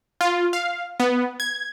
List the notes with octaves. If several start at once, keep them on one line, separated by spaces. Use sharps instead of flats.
F4
F5
B3
G#6